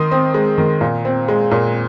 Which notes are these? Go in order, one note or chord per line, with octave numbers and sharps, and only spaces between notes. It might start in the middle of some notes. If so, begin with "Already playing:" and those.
Already playing: D#3 C6 D#6
C4
G#3
D#3
A#2
C4
G#3
A#2